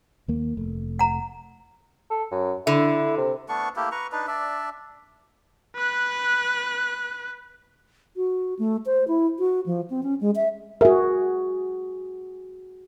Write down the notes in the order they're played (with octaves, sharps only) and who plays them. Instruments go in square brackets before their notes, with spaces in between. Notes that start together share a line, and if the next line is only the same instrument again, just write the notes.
[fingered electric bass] D#2 A#3
F1 A3
[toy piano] F#5 A#5
[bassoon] A4
F#2
[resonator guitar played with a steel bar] D3 [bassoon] E4
[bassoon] C3
[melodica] A3 B3 D4 C#6
A3 A#3 E4 G4
B4 A#5 C#6
D4 D#4 B4
D4 D5 E5
[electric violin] B4 F#6
[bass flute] F#4
A3
C5
E4
F#4
F3
C4
C#4
G#3
E5
[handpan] F#4 G#4 [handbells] A#4 E5